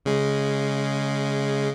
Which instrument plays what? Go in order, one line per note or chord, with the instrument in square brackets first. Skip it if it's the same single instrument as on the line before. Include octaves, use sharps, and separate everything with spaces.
[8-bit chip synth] C#3 G#3